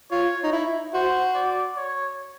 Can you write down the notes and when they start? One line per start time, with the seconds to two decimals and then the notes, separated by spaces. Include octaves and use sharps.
0.11 F4 C#5
0.44 D#4
0.53 E4
0.94 F#4 C5
1.35 D5
1.77 C#5